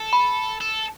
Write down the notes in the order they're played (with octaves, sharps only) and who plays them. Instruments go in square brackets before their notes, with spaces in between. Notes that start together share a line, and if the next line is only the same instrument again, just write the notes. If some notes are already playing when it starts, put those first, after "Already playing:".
Already playing: [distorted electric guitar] A4
[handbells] B5
[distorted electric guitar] A4